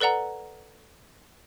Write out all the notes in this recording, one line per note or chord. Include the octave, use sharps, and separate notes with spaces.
A4 B4 D5 F#5 A#5